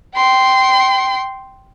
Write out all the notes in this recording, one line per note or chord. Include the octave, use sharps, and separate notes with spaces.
G5 C6